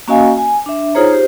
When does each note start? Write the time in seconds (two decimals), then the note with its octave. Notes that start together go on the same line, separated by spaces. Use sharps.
0.08 A#3 C#4 F#4 D#5 F5 G#5
0.38 G#5
0.66 D4 E5
0.95 D#4 F4 G#4 C5 C#5 A#5
1.13 G4 C5